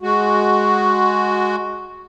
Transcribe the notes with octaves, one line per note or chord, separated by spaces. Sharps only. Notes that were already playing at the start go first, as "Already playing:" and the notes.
G#3 F#4